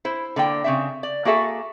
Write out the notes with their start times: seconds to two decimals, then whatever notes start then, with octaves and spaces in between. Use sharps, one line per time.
0.05 E4 C5
0.36 D3 A#3 D5 G5
0.64 C#3 C4 E5
1.03 D5
1.25 A#3 F#4 G#4 A4 E5